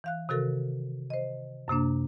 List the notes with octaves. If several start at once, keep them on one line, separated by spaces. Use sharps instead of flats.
E3 F5 F#6
C3 D#3 F#4 A4 A#4
C5 D#5
F#2 C3 A#3 D4